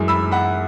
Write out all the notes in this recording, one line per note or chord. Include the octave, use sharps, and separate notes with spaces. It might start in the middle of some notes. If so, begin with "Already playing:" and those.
Already playing: F#2 E3 G#3
B5 E6
F#5 B5